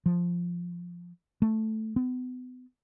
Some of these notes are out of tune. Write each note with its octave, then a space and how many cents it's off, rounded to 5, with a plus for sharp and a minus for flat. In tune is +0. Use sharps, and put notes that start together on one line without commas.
F3 +0
A3 -5
B3 +35